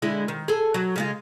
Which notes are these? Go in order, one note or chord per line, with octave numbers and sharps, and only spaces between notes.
D3 G#3 E4
D#3
G#4 A4
F#3
C#3 G#3 F4